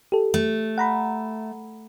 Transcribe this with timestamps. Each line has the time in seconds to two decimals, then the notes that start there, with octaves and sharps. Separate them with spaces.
0.12 G4 A4
0.34 A3
0.78 F#5 A#5 B5